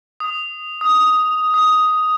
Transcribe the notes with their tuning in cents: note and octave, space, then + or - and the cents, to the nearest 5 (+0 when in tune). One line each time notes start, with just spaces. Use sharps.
D#6 -5
D#6 +5
D#6 +5